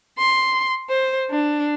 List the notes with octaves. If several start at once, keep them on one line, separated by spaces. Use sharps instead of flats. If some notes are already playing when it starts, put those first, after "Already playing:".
C6
C5
D4